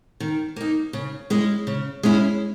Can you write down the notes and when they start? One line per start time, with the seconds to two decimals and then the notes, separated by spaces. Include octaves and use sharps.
0.20 D#3
0.56 A#3 D#4
0.93 C#3
1.30 G#3 C#4 E4
1.67 C#3
2.03 G#3 C#4 E4